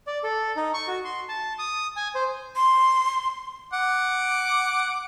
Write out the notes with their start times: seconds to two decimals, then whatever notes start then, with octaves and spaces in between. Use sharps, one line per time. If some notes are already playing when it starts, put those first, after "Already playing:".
0.07 D5
0.24 A4
0.56 D#4
0.74 C#6
0.88 F#4
1.04 C6
1.29 A5
1.59 D#6
1.96 G#5
2.15 C5
2.56 C6
3.73 F#5 D6